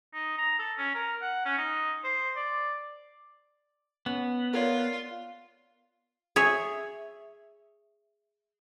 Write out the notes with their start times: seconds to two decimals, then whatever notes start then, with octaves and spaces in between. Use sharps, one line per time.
0.14 D#4
0.38 A#5
0.59 A4
0.78 C#4
0.95 A#4
1.21 F#5
1.45 C#4
1.58 D#4
2.04 C5
2.36 D5
4.06 B3 C#4
4.53 F4 A#4 C#5 D5
6.36 G#4 C#5 E5